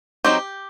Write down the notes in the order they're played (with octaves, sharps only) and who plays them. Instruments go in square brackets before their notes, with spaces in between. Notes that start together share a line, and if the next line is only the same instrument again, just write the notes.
[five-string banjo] F#3 C4 D#4 G4